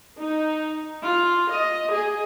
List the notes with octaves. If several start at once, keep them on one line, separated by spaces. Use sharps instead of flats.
D#4
F4
D#5
G#4